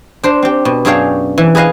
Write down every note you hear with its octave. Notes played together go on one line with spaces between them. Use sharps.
D4 C5
C4 G4
B2
F#2 D4 G#4 C#5 F5 G5
E3
G#4 B4 D#5 F5 G#5